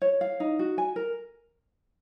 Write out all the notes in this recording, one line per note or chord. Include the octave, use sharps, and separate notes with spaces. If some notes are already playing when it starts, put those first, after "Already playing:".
C#5
F5
D#4
F#4
G#5
A#4